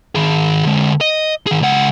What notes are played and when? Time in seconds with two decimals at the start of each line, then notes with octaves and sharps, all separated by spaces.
0.15 D#3 G#4
0.65 D3 G#3
1.01 D#5
1.47 D#3 G#4
1.61 C#2 F#5